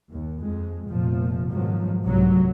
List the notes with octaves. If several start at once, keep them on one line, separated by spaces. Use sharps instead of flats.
D#2
F2 G#3
F1 A#2 F3
G#2 B2 D#3 F3 F#3
F1 C2 G#2 F#3